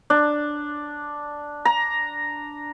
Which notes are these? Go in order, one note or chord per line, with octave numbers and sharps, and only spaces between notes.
D4
A#5